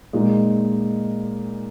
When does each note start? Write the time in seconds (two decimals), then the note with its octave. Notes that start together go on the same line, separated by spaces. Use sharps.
0.13 A#2 G#3 D#4